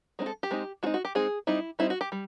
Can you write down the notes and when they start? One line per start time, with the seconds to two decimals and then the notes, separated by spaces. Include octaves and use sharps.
0.19 G#3 C4 D#4
0.26 A4
0.43 G4
0.51 G#3 C4 D#4
0.83 G#3 C4 D#4 F#4
0.94 F#4
1.05 G4
1.15 G#3 C4 D#4 G#4
1.47 G3 C4 D#4 E4
1.79 G3 C4 D#4 E4
1.90 F#4
2.01 G4
2.12 G3